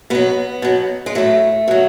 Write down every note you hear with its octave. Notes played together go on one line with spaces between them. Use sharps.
B2 F#3 B3
B2 F#3
G#3
A2 F#3 A3
B2 F#3